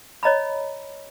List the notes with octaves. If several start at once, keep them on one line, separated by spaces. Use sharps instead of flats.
C#5 D#5 A#5 B5